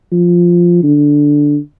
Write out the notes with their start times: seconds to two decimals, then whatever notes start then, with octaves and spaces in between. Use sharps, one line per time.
0.12 F3
0.83 D3